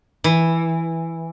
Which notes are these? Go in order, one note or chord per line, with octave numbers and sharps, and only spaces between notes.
E3